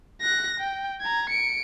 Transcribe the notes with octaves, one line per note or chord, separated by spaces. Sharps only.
F#6 A#6
G5
A#5 G#6
C#7 D7